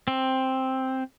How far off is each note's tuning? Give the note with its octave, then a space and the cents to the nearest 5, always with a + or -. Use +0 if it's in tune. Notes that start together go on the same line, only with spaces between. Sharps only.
C4 +5